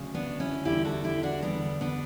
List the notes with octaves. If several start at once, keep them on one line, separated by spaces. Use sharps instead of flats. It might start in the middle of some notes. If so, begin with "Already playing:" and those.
Already playing: D2 C#3 F#3
B3 D4
C#4 E4
E2 D3 G3 E4 G4
F#4 A4
E4 G4
D4 F#4
E2 D3 G3 B3 D4
B3 D4